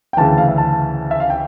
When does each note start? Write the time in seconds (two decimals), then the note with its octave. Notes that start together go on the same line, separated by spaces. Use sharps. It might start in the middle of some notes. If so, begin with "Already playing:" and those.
0.13 G5
0.17 D2 C#3 E3 A5
0.38 F5
0.48 E5
0.58 A5
1.11 E5
1.20 F5
1.30 G5